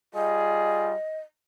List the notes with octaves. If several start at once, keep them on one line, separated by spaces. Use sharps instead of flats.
G3 F4 G#4 D#5